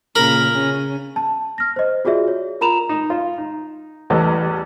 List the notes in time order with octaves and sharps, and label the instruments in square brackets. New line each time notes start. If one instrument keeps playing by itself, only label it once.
[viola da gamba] A#2 C#3 [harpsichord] A#4 B5
[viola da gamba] C#3 C#4
[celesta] A5
F6 A#6
C5 D#5
F4 F#4 G#4 D5 E5
C#5
F4 A#4 A#5 B5 E7 F7
[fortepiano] D#4
F4
D#4
A1 E2 G3 B3 A4 D#5